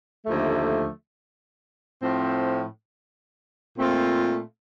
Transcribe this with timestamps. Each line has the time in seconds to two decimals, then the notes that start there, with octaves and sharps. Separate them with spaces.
0.25 D#2 D3 F3 A3
2.00 A2 F3 C4
3.77 A#2 A3 C4 F4